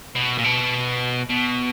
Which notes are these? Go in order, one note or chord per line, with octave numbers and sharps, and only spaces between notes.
B2
A#2
B2
B2